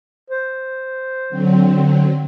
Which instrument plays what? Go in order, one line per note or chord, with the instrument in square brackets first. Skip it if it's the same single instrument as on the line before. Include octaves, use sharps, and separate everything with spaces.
[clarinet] C5
[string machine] D3 F#3 C4